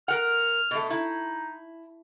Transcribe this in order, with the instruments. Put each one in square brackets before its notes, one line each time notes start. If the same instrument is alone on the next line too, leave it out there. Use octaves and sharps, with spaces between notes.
[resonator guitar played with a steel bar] A#4 F#5 [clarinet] F6
[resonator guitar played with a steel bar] B2 A3
[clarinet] D#4 [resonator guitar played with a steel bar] E4